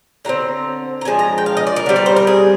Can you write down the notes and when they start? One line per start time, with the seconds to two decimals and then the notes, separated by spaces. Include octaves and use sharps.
0.25 D3 G3 C4 A#5
1.01 A#5
1.05 F3 G#3 D4 G#5
1.19 A#5
1.38 G5
1.46 F5
1.57 D#5
1.67 D5
1.76 A#4
1.86 D3
1.89 G3 C4
1.96 D5
2.06 C5
2.16 A#4
2.27 G#4